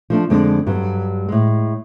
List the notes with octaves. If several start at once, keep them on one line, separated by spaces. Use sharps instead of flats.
F3 A3 D4
F2 D3 G#3 D4
G2 F#3 G3
A2 G#3